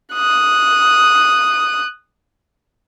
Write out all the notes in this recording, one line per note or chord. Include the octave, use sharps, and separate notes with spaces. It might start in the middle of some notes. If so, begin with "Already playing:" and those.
D#6 F#6